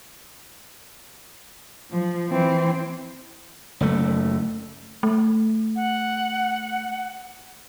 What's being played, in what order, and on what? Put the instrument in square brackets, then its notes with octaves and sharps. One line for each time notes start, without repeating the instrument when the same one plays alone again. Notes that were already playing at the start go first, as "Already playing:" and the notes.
[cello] F3
E3 C4
[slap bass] F#1 A3
[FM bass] A3
[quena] F#5